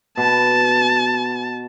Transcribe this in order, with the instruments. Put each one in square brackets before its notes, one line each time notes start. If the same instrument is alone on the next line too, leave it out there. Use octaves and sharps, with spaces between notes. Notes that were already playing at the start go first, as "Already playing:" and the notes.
[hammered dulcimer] B2 [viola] A5